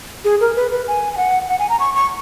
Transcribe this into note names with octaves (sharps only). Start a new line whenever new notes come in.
G#4
A#4
B4
B4
G#5
G#5
F#5
F#5
G#5
A#5
C#6
C#6